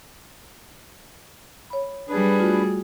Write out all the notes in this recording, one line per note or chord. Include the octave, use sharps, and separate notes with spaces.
C#5 B5
G3 D4 G#4 B4
A3 F4 F#4